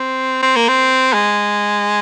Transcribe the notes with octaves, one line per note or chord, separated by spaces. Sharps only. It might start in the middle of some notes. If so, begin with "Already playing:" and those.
Already playing: C4
C4
A#3
C4
G#3